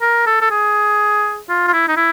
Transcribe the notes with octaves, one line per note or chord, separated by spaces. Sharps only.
A#4
A4
A4
G#4
F4
F4
E4
D#4
E4